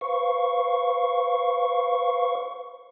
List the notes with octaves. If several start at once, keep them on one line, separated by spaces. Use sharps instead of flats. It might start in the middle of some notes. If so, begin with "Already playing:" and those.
B4 C5 F5 C#6